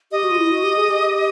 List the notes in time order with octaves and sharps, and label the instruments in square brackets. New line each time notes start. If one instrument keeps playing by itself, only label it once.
[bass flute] G4 [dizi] D#5
[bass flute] F#4
F4
E4
F#4
G4
G#4
G4